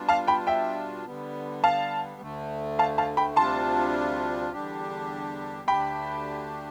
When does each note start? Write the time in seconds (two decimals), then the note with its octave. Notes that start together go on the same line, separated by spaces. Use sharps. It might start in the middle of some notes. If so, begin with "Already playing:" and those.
Already playing: B2 G3 D4 F4
0.09 F5 A5
0.27 G5 B5
0.47 E5 G5
1.05 D3 G3 B3
1.64 F5 A5
2.21 D2 D3 A3
2.79 F5 A5
2.98 F5 A5
3.17 G5 B5
3.36 D2 C3 G3 D4 F4 A5 C6
4.52 E2 D3 G3 D4 G4
5.68 D2 D3 A3 D4 G4 G5 B5